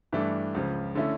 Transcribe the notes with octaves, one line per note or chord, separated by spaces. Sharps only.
G2 E3 A3 D4
C#2 C#3 F3
D3 A3 C#4 E4